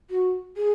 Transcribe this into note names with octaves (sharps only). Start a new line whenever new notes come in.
F#4
G#4